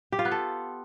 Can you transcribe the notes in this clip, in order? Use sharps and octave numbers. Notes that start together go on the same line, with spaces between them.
G4
F4
B3
A4